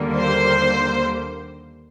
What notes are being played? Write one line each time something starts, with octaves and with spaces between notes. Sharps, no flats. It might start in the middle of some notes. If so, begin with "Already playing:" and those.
Already playing: D#2 D3 G3 A#3
C5